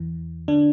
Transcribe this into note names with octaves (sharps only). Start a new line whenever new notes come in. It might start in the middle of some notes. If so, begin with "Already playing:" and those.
Already playing: E2 E3
D3 D4